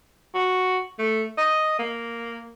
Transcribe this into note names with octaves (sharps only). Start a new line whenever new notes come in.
F#4
A3
D#5
A#3